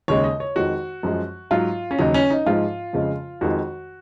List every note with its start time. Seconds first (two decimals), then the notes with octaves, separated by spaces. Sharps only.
0.08 D#2 C#3 G#3 C#5
0.24 D#5
0.40 C#5
0.55 F2 D#3 G#3 F#4
1.03 F#2 F3 G#3
1.51 G#2 F#3 F4
1.91 C#4
1.99 D#2 C#3 F#3 D#4
2.14 C#4
2.30 D#4
2.46 G#2 F3 G#3 F4
2.93 F2 C#3 F3 G#3
3.41 F2 D#3 G#3 F#4